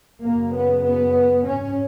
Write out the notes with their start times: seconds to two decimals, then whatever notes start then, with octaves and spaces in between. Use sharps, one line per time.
0.23 F#2 C#3 A#3
0.54 B3
0.84 B3
1.45 G#2 C#4